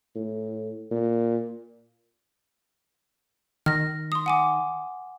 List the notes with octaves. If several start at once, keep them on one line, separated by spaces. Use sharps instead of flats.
A2
A#2
D#3 F6 A#6
C6 D#6
F#5 G#5 D6